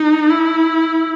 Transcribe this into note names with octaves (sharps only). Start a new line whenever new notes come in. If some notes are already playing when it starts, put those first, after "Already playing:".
Already playing: D#4
E4